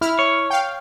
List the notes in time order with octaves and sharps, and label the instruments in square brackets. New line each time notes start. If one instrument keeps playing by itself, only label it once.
[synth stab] E4 F6
[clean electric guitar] C#5
[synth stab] F5 G5